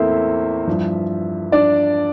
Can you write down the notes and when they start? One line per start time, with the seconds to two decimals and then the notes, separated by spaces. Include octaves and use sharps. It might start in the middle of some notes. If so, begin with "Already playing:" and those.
Already playing: E2 A3 A#3 C4 E4 C5 E5
0.67 G2 F3
1.52 D4 D5